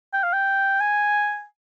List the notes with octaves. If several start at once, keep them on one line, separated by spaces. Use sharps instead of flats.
G5
F5
G5
G#5